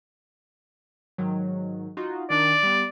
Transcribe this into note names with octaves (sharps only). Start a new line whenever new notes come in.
G#2 D#3 F#3
D#4 F4 F#4
D#3 D4 D5
G3 B3